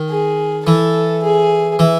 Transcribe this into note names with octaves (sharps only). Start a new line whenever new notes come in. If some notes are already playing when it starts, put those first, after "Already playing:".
Already playing: D#3
G#4
E3 A4
G#4
E3